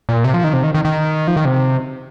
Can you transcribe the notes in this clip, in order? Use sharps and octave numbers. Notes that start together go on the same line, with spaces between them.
A#2
C3
F3
D#3
C3
D#3
D#3
D#3
F3
D#3
C3